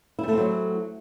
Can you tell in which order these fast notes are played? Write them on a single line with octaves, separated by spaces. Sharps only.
E4 G3 A3 C4 F#3